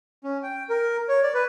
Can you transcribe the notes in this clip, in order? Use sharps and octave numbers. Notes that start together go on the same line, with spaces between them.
C#4
G5
A#4
C#5
D5
B4